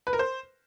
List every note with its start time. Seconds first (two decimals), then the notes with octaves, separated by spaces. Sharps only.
0.07 B4
0.13 A#4
0.19 C5